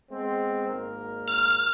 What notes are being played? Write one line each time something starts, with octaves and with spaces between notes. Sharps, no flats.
G#3 B3 C4
G#1 A#3 A#4
F6